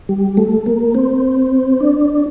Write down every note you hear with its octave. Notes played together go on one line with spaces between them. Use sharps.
G3
A3
A#3
C4
D4